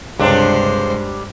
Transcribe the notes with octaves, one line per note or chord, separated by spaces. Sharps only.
C#2 G2 C3 G3 G#3 D4 C5